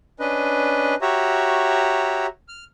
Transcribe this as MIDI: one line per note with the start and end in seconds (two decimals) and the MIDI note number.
0.20 0.95 61
0.20 0.95 62
0.20 0.95 71
0.20 0.95 75
1.02 2.26 66
1.02 2.26 67
1.02 2.26 73
1.02 2.26 76
1.02 2.26 82
2.48 2.64 89